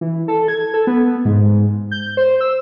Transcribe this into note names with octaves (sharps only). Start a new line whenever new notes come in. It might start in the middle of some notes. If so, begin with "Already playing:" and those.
E3
A4
G#6
A4
B3
G#2
G6
C5
E6